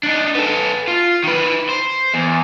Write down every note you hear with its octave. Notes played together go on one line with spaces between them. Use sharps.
D4 D#4
B3 A4
F4
D#3 B4
C5
E2